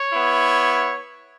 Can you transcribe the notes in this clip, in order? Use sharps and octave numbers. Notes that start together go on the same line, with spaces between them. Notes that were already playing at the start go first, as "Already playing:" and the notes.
Already playing: C#5
B3 E4